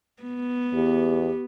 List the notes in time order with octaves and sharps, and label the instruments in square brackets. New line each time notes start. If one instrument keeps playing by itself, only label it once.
[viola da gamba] B3
[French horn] E2 [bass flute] G4